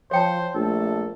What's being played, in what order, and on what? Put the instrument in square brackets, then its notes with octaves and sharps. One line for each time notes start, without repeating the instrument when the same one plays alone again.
[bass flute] F3 [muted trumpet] C5 [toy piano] C#5 G5 A5
[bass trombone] A#1 [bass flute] A3 [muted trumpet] A4